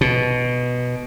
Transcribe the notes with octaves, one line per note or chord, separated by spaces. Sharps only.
B2